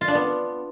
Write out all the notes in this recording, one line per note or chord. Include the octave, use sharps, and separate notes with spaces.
F4
D4
B3